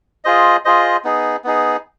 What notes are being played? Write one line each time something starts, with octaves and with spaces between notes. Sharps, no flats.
F4 G#4 C5 D#5
F4 G#4 C5 D#5
B3 D#4 G#4
B3 D#4 G#4